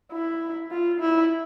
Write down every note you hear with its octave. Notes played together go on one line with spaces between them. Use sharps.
E4
F4
E4